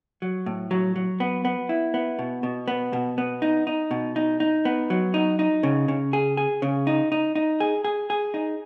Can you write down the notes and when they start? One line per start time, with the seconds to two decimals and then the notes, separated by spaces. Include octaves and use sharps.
0.22 F#3
0.46 A2
0.71 F#3
0.96 F#3
1.20 B3
1.45 B3
1.69 E4
1.94 B3
2.19 B2
2.43 B2
2.68 B3
2.93 B2
3.18 B3
3.42 D#4
3.67 D#4
3.91 B2
4.16 D#4
4.40 D#4
4.65 B3
4.90 F#3
5.14 D#4
5.39 D#4
5.63 C#3
5.88 C#3
6.13 G#4
6.37 G#4
6.62 C#3
6.87 D#4
7.12 D#4
7.35 D#4
7.60 G#4
7.84 G#4
8.10 G#4
8.34 D#4